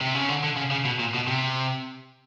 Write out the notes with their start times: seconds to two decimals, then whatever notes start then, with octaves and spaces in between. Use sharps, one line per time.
0.01 C3
0.15 C#3
0.29 D3
0.44 D3
0.57 C#3
0.71 C#3
0.85 B2
0.99 A#2
1.14 B2
1.27 C3